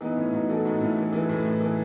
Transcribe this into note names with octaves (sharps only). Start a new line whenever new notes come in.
E3 B3 D#4
A2 C#4 E4
A2 D#4 F#4
E3 F#4 A4
A2 D#4 F#4
A2 C#4 E4
E3
E3
A2
A2
E3